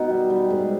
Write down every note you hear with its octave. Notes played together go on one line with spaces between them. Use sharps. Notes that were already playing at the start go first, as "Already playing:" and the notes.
Already playing: B2 D#4
G3
G3
G#2